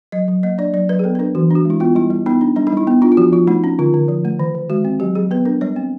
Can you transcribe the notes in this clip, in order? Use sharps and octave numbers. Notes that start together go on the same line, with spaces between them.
F#3 D#5
F#3
A#3 D#5
D4 D5
F#3 D5
F#3 B4
G#4
B3 A4
B4
D4 A#4
E3 F#4
D4 F#4
G#3 E4
B3 F4
G3 E4
G3
B3 D#4
D4
G3 D4
D#4
G3 E4
B3
D4 F4
F4
F3 F#4
F3 F4
A3 D#4
C#4
D3 F4
D3
F3
A3
D#3
D#3
G#3 F#4
C4
F#3 G4
F#3 G#4
B3 B4
D4 A#4
G3 C#5
C4